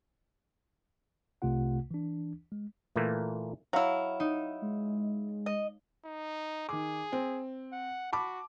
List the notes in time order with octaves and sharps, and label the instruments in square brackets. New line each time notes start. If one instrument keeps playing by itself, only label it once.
[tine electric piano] C2 C3 A3 F4 F#5
E3 D4
G#3
[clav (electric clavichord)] A#2 E3 A3 A#3
[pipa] F#3 E4 [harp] C#5 F5
[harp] D#4
[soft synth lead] G#3
[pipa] D#5
[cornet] D#4
[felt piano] D#3 D6 [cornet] G#4
[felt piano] C4
[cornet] F#5
[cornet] F#4 [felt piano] A5 B5 D6